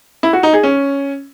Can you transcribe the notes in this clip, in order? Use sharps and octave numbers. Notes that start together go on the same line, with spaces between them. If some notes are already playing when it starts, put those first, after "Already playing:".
E4
F#4
D#4
G#4
C#4